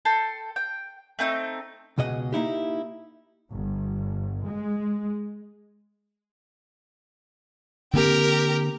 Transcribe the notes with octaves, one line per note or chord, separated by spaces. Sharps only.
A4 G5 C6
G5
A3 C4 D#4
C#2 B2 G#4 D#5 F#5
A#3 D#4 E4 G4
G1
G#3
D3 A#3 C4 G4 A#4